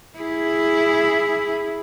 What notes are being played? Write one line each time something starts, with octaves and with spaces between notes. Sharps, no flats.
E4 G#4